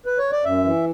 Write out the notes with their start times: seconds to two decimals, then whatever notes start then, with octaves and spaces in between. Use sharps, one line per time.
0.06 B4
0.18 C#5
0.32 D5
0.45 F#2 E5
0.64 E3